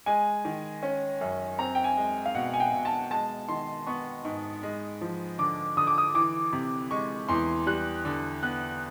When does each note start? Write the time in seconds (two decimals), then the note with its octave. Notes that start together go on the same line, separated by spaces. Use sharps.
0.06 G#3 G#5
0.45 D#3
0.83 C#4
1.21 F#2
1.59 C4 A#5
1.75 G5
1.84 G#5
1.97 G#3
2.26 F5
2.35 B2 F#5
2.53 G#5
2.60 G5
2.73 B2
2.85 A5
3.11 G#3 A5
3.48 D#3 C6
3.87 B3 C#6
4.25 G#2
4.63 G#3
5.01 F3
5.39 D3 D6
5.77 D3 D#6
5.87 D6
5.98 D#6
6.14 E3 D6
6.53 C3
6.91 G#3 C#6
7.28 E2 C6
7.67 G3 F#6
8.05 D3
8.43 B3 F#6